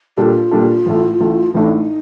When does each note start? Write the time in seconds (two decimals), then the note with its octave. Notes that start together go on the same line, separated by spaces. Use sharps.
0.17 A#2 G3 D4 F4 G4 A4
0.51 A#2 G3 D4 A4
0.86 A1 A2 A3
1.20 A1 A2 A3
1.54 A1 A2 A3 D4 D#4